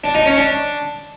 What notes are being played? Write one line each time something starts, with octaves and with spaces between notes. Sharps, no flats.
D4
D#4
C#4
D4